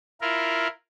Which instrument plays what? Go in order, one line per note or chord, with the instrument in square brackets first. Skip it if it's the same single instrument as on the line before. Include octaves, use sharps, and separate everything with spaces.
[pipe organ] E4 F4 A#4